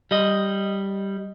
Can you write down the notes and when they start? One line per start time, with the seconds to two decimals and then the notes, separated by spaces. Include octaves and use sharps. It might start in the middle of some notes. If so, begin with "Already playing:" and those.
0.11 G3 D#5